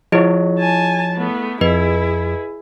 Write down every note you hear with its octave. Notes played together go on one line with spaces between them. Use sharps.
F3 E4 G#4 C#5 D#5
G#5 A5
A3 B3
F2 E4 G#4 B4 D#5